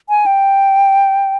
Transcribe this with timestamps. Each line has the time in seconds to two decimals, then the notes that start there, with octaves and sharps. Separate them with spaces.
0.09 G#5
0.26 G5